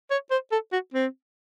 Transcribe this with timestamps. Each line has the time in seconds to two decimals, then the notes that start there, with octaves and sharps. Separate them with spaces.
0.10 C#5
0.31 C5
0.51 A4
0.72 F#4
0.94 C4